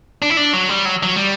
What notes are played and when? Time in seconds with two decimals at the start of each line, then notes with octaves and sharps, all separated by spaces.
0.22 D4
0.30 E4
0.37 D4
0.53 F#3
0.69 G3
0.85 F#3
1.03 F#3
1.16 G3